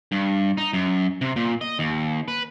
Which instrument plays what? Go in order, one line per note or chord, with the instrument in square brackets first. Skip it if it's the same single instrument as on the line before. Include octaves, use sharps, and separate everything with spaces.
[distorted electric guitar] G2
D#4
F#2
C3
A#2
D#5
D#2
B4